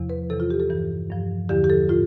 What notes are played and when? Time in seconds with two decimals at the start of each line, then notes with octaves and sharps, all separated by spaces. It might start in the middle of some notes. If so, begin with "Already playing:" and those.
Already playing: E2 C3 F3
0.10 B4
0.29 E2 C3 E3 A4
0.40 F4
0.50 G4
0.60 A4
0.69 G2 E3
1.10 G2 F3
1.49 E2 D3 F3 G4
1.64 G4
1.70 A4
1.89 A2 F4